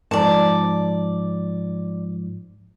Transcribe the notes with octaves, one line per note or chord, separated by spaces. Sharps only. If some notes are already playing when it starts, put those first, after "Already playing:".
G#2 F3 D5 A5